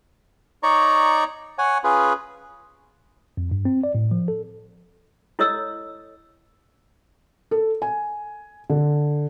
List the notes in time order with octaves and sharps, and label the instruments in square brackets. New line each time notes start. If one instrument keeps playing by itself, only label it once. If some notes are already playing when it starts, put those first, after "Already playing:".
[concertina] D#4 C#5 D5 A#5 C#6
C#5 F#5 G#5
C#4 F4 G#4 B4
[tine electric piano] F2
G2
C4
D5
A2
F3
A4
[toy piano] E4 A4 C#5 D#5 E6
[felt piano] A4
G#5
D3